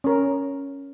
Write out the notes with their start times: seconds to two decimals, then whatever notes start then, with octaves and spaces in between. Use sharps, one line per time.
0.04 C#4 A#4